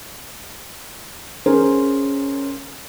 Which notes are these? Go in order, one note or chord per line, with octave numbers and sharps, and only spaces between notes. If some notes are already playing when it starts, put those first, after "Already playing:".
C#4 G#4 A#4 C5